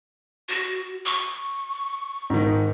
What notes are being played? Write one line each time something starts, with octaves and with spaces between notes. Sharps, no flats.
F#4
C#6
G#2 D#3